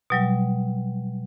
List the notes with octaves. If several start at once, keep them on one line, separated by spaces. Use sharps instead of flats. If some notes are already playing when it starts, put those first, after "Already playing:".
B2 F#3 G3